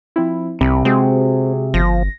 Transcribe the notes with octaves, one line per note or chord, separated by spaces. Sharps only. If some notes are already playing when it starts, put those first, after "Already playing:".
F3 C4 E4
C2 C3 B5
G#3 C4 F#4 G#4
G1 F3 A#6